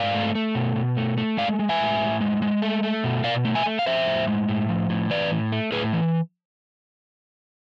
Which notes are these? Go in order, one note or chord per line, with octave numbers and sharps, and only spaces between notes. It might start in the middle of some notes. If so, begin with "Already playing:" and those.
Already playing: G#2 D5 F5
A3
A3
B2
B2
A3
A3
G#3 D5 F5
G#3
E5 G#5
A2
A2
G#3
G#3
A3
A3
B2
B2 D5 F5
A3
E5 G#5
A3
F5
F3 C5 E5
A2
G#3
A2
F3
A2
E3 B4 D5
A2
A3
A2 G#4 B4
E3